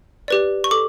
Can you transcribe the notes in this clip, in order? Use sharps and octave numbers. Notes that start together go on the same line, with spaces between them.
G4 B4 D5
C#6
A4 D6